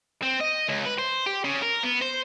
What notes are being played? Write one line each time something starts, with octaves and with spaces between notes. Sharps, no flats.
C4
D#5
C#2
B4
C5
G4
C#3
A#4
B3
C5